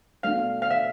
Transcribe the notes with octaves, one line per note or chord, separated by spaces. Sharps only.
B2 A3 D4 F5
F5
E5